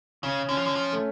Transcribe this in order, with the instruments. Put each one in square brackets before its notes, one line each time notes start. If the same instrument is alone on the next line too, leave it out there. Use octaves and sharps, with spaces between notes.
[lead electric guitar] C#3 [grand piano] C#4
[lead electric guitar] D3 [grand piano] C#4
[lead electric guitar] F3
D3
F3
[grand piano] A3